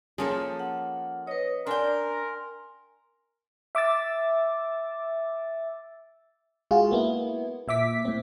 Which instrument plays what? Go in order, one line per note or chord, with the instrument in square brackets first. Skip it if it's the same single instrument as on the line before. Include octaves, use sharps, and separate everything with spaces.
[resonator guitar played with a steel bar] F3 A#3 A4 [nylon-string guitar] C#4 G#4
[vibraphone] F#5
[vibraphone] B4 C#5 [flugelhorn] D#5
[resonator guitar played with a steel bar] D4 G5 [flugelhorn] A#4 [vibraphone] G#5 C6
[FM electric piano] E5 D6 E6 A6
G#3 F4 F#4 G#4
A#3 B3 E4
A#2 E5 D6 B6
A2 C4